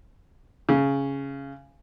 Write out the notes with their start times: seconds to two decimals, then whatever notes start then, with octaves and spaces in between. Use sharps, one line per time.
0.69 C#3